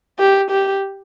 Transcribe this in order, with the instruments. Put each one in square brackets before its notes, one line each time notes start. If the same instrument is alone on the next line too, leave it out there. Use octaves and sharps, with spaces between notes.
[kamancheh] G4
G4